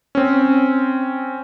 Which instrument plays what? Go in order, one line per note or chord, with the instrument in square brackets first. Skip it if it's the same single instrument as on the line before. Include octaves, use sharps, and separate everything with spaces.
[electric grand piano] C4 C#4